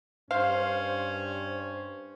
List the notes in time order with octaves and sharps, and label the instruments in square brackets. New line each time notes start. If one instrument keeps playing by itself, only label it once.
[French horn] G2 [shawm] C#4 [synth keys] C5 [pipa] F5